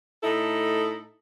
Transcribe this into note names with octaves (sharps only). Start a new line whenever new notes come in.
A2 D#4 E4 A4